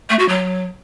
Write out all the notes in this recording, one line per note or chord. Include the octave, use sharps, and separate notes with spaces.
A3
F#4
F#3